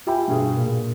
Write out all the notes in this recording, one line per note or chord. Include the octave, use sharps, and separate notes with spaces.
F4 G4 E5 G5 G#5 B5
G2 B2 G#4
A#2